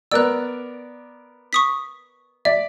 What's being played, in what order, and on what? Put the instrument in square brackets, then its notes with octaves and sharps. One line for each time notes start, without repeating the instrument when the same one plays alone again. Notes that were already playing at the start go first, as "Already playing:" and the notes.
[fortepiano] B3 A#4 D5 [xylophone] E6 F#6
[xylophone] C#6 D#6 B6
[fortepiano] D5 [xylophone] E5